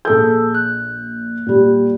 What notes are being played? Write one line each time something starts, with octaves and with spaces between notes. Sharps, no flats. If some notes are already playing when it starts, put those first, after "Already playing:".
A#1 G#4 A4 G6
F#6
A#2 G3